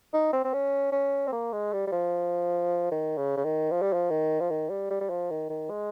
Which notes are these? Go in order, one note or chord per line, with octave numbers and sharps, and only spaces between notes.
D#4
C4
C4
C#4
C#4
C4
A#3
G#3
G3
G3
F3
D#3
C#3
C#3
D#3
F3
G3
F3
D#3
F3
D#3
G3
G3
G3
F3
D#3
D#3
G#3